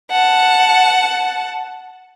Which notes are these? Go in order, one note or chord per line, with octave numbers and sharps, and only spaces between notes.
F#5 A5